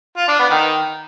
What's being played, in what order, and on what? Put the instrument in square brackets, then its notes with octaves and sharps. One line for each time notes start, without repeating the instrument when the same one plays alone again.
[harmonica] F4
D4
B3
D#3